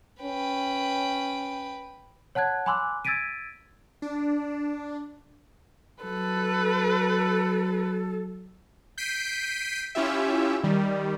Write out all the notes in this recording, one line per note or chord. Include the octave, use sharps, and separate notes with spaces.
C#4 B4 G5
C#5 F#5 A5 F#6 G#6
G#5 B5 C6 D6 E6 F#6
E6 G#6 A6 B6 D7 D#7
D4
F#3 A4 B4
G6 B6 C7 D7 D#7
C#4 E4 F4 G4 E5
D#3 G3